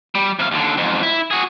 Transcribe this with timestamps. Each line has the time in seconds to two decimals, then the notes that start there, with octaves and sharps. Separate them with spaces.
0.15 G3
0.39 C3 F5
0.51 D#2 D3
0.77 F2 G#2
1.03 E4
1.31 F#4 G#4